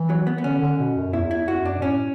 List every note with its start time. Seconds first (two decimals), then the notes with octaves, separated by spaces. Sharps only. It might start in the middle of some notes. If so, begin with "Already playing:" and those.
Already playing: E3
0.10 F#3
0.27 B3
0.38 B3
0.44 D3 C#4
0.61 D3
0.79 B2
0.96 F#2
1.13 E2 E4
1.31 E4
1.48 F#2 F#4
1.65 D4
1.78 B2
1.82 A2 C#4